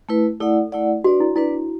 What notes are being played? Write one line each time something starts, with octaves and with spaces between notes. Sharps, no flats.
A3 E4 B4
A3 E4 A4 D5 F#5
A3 E4 D5 F#5
D4 F#4 B4 D5
E4
D4 E4 B4 D5